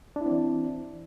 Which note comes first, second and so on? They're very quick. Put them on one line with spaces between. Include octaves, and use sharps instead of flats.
D4 E4 C4 E3